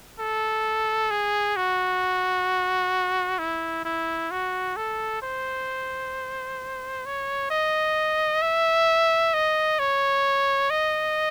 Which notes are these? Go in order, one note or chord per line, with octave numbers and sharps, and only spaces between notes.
A4
G#4
F#4
E4
E4
F#4
A4
C5
C#5
D#5
E5
D#5
C#5
D#5